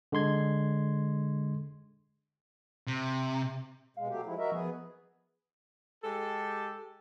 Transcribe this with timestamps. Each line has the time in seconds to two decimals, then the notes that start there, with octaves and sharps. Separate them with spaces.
0.12 D3 G#3 C6 G#6
2.87 C3
3.97 B2 G#3 F5
4.08 F#3 A3 G4
4.26 F3 G#3 E4
4.38 F#4 A#4 D#5 E5
4.52 F3 B3 G#4
6.03 G#3 G4 A4